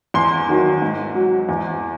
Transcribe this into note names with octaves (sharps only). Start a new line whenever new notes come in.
E2 C6
D#3 F#3
G#2
F#3
E2